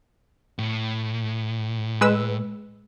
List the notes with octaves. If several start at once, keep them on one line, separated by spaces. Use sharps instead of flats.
A2
G#3 B4 E6